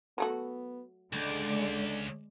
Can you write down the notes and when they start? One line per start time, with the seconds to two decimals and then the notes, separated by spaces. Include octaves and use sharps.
0.18 F#3 A3 B3 F#4
1.13 C#2 D3 G#3 D5